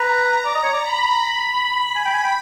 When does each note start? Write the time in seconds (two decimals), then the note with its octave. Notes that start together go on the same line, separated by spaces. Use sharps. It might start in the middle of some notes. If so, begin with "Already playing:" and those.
Already playing: B4 A#5
0.45 D5
0.55 D#5
0.64 C#5
0.73 D5
0.82 B5
1.96 G#5 B5
2.05 G5
2.13 G#5
2.24 G5